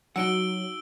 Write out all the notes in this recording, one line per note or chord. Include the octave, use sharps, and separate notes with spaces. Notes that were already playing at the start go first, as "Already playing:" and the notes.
F#3 D#4 F#4 F#5 E6 D7 G7